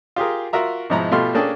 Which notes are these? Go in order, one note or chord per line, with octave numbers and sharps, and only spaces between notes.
F4 G4 G#4 A#4
F4 F#4 A#4 E5 A#5
G#2 B2 F3 E4 A#5
B2 A3 F4 G4 C6 F6
A#3 C#4 D4 G#4 A4 G5